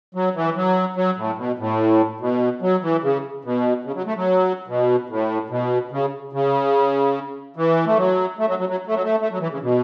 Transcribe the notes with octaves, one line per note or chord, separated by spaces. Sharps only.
F#3
E3
F#3
F#3
A2
B2
A2
B2
F#3
E3
C#3
B2
C#3
F#3
A3
F#3
B2
A2
B2
C#3
C#3
E3
A3
F#3
A3
F#3
F#3
F#3
A3
F#3
A3
A3
F#3
E3
C#3
B2